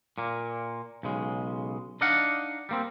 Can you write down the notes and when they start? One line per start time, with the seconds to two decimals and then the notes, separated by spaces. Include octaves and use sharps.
0.18 A#2 A#3
1.03 B1 C#3 G#3
2.01 D4 D#4 D5 D#5 F5 F#5
2.69 G3 A#3 C4